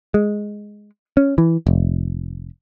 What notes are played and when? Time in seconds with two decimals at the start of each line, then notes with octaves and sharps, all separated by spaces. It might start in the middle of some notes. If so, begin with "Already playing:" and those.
0.14 G#3
1.17 C#4
1.38 E3
1.67 F1